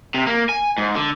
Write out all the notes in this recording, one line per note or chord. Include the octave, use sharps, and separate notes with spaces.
C3
A#3
G#5
G#2
D3